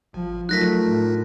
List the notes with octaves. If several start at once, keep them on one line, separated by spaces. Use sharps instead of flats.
G#1 F3
F#3 A3 D#4 F4 A#4 F#6 A#6 B6
A2